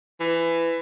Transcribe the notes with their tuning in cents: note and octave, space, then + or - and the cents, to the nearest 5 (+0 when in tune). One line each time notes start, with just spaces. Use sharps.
E3 +20